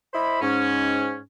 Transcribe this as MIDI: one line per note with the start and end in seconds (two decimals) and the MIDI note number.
0.14 0.40 64
0.14 0.40 72
0.14 0.40 75
0.14 0.40 83
0.41 1.18 44
0.41 1.18 61